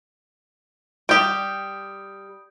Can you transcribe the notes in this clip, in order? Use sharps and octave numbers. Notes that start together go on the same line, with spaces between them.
G3 G4 D#6 G6 D7